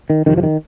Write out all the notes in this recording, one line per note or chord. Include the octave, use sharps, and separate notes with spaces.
D#3
F2 C3 D#3
F3
D#3